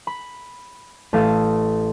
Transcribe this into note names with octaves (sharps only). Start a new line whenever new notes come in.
B5
A1 A3 F5 A5 D#6